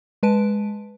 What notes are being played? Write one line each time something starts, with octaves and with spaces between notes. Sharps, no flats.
G#3 B4 A5 D7